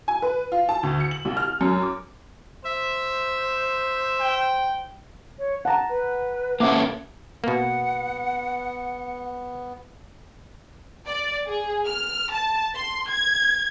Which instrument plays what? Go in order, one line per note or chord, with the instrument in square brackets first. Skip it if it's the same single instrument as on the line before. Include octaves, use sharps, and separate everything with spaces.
[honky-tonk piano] G#5
B4
F4
A5
D2
C#7
F#7
C2
F6
F#2
D6
[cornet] C5 [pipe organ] E5
[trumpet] G5
[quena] C#5
[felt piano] F#5 A#5 [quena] A5
[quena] B4
[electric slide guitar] A#3 C#4 A4 [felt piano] E5 F#5 D6
[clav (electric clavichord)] B2 A#3 [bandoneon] B3 [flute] F#5
[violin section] D5
G#4
F6
A5
C6
G#6